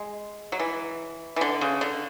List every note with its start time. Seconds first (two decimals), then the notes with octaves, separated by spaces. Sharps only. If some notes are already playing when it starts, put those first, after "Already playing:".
Already playing: G#3
0.52 F#3
0.59 E3
1.36 E3
1.41 D3
1.61 C#3
1.81 D3